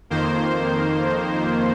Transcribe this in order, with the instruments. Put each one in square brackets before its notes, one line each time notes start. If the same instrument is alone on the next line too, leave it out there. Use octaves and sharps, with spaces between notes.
[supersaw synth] F2 D#3 A#3 C5